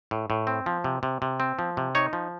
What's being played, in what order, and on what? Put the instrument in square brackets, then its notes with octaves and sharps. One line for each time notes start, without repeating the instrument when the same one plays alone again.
[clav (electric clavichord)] A2
A2
C4
F3
C3
C3
C3
C4
F3
C3
D#4 C#5
F3